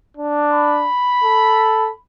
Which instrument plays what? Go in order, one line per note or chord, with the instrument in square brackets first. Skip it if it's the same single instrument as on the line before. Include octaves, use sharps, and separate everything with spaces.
[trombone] D4
[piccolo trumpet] B5
[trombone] A4